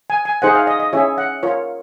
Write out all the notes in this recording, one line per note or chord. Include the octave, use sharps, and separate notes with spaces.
G#5
G#5
D#4 G#4 C5 F#5
F5
D#5
D#5
C#4 E4 G#4 C#5 E5
F#5
F4 A#4 C#5